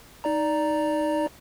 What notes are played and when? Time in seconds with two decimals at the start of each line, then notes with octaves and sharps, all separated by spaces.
0.24 D#4 D5 A#5